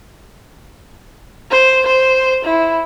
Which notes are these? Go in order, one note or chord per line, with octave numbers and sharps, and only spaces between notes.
C5
C5
E4